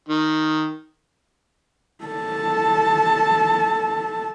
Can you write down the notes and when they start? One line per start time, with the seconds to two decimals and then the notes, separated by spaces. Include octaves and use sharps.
0.08 D#3
2.04 A4 A5